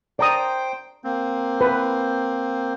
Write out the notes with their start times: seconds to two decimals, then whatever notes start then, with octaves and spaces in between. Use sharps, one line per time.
0.19 C5 D5 G5 A#5 D#6
1.04 A#3 C4
1.61 B4